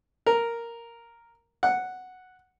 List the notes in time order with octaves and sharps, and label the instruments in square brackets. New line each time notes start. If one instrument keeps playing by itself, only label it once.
[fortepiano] A#4
F#5